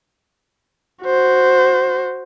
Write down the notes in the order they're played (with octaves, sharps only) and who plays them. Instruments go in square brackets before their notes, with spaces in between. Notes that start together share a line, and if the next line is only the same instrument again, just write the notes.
[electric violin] F#4 C5